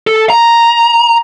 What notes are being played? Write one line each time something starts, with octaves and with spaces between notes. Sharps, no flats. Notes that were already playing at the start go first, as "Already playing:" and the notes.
A4
A#5